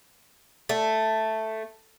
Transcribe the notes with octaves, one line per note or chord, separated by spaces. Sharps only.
A3